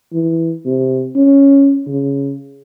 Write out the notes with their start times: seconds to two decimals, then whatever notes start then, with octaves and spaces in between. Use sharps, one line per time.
0.13 E3
0.65 C3
1.16 C#4
1.87 C#3